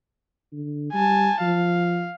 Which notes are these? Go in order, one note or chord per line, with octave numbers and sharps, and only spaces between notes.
D3
G3 G#5 A5
F3 F5